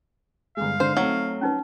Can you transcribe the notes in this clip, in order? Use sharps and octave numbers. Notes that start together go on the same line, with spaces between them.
G1 G#3 F5
G#2 D3 C5
F#3 A3 C4 D#4
C#4 D#4 B4